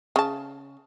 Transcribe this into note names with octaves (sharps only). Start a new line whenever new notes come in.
C#3 A5